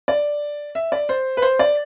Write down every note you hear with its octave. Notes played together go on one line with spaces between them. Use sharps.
D5
E5
D5
C5
B4
C5
D5